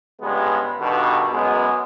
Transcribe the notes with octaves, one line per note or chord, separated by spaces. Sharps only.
C#2 G2 G#3 B3
G2 B2 D3 D#3
F#2 G#3 B3